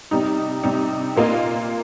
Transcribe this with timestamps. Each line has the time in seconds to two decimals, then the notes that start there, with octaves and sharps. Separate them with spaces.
0.11 C3 G3 D#4
0.63 C3 G3 D#4
1.16 A#2 A#3 F4 D#5